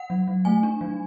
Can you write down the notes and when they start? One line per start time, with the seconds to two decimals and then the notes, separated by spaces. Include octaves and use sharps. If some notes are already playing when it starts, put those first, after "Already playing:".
Already playing: F#5
0.10 F#3
0.28 F#3
0.45 A3 G#5
0.63 D4
0.81 F#3